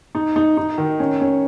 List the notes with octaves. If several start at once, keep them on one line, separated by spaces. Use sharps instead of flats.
D#4
D#4
D#4
D#3
C#4
C#4